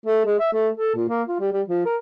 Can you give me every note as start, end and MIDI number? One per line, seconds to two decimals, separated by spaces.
0.06 0.23 57
0.26 0.37 56
0.40 0.52 76
0.53 0.69 57
0.77 0.94 69
0.95 1.08 46
1.09 1.23 58
1.28 1.39 65
1.40 1.50 55
1.53 1.62 55
1.68 1.82 53
1.86 1.97 70